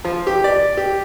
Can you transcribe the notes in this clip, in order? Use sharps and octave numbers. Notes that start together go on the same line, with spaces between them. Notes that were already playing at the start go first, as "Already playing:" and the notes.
F3
G4
D5
G4